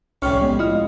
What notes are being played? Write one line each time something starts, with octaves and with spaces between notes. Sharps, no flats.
C2 F2 A2 G3 C#4 C#5 C#6 F6
G#3 B3
E4 F4 D#5 D#6 F6